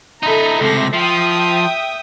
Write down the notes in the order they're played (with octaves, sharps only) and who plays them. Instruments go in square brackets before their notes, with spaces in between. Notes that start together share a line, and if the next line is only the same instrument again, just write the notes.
[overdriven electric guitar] D#4 E4 [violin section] A4 A#5
[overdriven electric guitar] C#2 C3 [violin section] A3 A#6
[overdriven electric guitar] F3 [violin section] E5 G5 D#6